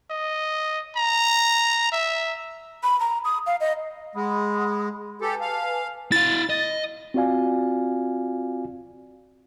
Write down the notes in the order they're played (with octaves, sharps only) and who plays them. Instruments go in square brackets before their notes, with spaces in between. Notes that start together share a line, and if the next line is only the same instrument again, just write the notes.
[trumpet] D#5
A#5
E5
[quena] B5
A#5
D#6
F5
D#5
[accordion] G#3 [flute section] F#5 B5 D#6
[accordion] G4 A4 [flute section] B4 G#5 A5
[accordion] F5
[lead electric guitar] E4 F5 [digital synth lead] A6
[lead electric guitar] D#5
[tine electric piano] C4 F4 F#4 D5 F5 G#5